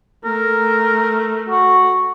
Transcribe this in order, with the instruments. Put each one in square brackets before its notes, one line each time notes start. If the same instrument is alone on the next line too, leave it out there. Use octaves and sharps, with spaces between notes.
[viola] A3 [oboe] A#4
[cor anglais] F#4